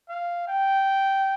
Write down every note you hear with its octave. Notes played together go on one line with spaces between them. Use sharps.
F5
G5